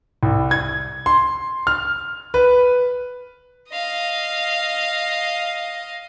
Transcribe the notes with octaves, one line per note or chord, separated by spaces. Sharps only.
C2
G#6
C6
F6
B4
D#5 F5